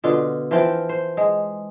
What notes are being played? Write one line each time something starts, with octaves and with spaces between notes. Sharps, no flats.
B2 D3 F4
E3 F3 F4 G5
C5
G#3